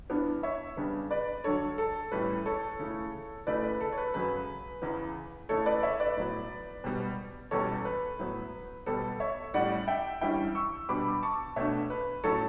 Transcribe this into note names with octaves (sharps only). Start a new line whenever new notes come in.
G2 E3 B3 D4
C#5 E5
C#3 G3 B3 D4
B4 D5
G2 D3 F#3 A4 C#5
A4
A2 E3 G3 C#4 B4
A4 C#5
C#3 E3 A3
F#2 C#3 E3 A3 B4 D5
B4
A4
C#5
B4
F#2 C#3 F#3 B4
E2 C#3 E3 B3
C#3 E3 A3 A4 C#5
B4 D5
C#5 E5
B4 D5
A2 F#3 B3
B2 G3 B3
E2 B2 G3 C#4 A4 C#5
B4
A2 F#3 B3
B2 G3 B3 A4
C#5 E5
A2 G3 C#4 D5 F#5
E5 G5
G2 E3 G3 C#4 E5 G5
C#6 E6
B2 G3 B3 D4 B5 D6
A5 C#6
B2 A3 D4 C#5 E5
B4
A2 F#3 C#4 A4 C#5